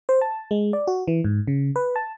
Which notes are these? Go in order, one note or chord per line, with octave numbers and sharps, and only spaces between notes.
C5
A5
G#3
D5
F#4
E3
G#2
C#3
B4
A5